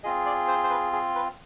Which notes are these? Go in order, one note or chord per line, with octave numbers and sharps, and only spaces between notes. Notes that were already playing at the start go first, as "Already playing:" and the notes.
C4 F4 G#4 D#5
D5
C5
C5
B4
G#4
B4